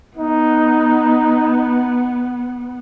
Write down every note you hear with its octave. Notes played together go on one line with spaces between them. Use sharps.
B3 D#4